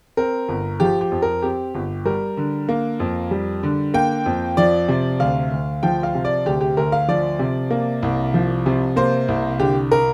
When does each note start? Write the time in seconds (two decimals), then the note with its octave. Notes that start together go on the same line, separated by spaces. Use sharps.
0.17 C4 A#4
0.49 G1
0.80 F3 G4
1.01 G4
1.11 F2
1.22 A#4
1.42 C4 G4
1.75 G1
2.05 G3 A#4
2.37 D3
2.69 A#3
3.00 F2
3.31 G3
3.63 D3
3.94 A#3 G5
4.26 F2
4.57 F3 D5
4.88 C3
5.20 D2 F5
5.52 D2
5.83 F3 G5
6.03 F5
6.14 C3
6.25 D5
6.46 D2 G4
6.61 G4
6.77 D2 A#4
6.92 F5
7.08 F3 D5
7.39 C3
7.70 A#3
8.03 C2
8.34 F3
8.66 C3
8.96 A#3 C5
9.28 C2
9.60 D3 G4
9.92 A#4